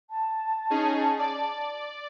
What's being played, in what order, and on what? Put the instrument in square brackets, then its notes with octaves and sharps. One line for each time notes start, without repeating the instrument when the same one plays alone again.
[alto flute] A5
[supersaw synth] C#4 D#4 G#4
D5